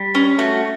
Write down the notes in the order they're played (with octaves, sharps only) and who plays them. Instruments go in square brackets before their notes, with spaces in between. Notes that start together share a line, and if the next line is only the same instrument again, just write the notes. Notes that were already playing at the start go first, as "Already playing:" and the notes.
Already playing: [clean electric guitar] G3
[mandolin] C#4
[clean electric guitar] A3 [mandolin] F#4